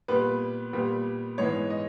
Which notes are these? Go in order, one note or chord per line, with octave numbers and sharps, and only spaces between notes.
A#2 G3 B3 B4
A#2 G3 B3
G#2 E3 G#3 B3 C#5
D#5